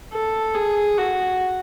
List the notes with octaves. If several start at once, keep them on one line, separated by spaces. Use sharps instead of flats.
A4
G#4
F#4